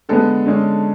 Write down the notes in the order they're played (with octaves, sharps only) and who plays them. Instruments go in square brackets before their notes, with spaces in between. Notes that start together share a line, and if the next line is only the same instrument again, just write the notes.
[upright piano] D3 G#3 B3 A4
D3 G#3 C#4